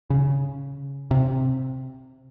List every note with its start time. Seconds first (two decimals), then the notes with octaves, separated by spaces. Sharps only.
0.10 C#3
1.11 C3